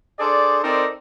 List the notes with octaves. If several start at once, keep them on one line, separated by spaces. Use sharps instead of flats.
D4 G#4 A4 C5 D5
C4 D#4 A4 A#4 C5 D5